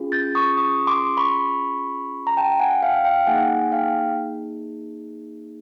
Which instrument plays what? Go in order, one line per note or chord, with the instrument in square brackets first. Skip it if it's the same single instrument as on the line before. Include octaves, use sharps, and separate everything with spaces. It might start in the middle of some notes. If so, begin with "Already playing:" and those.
Already playing: [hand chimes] C#4 F4 G#4
G6 A6
C#6 D#6
C#6 D#6
C6 D6
B5 C#6
A#5
G5 A5
F#5 G#5
F5 G5
F5 G5
A#3 D#4 G#4 F#5 G#5
G#5
F5 G5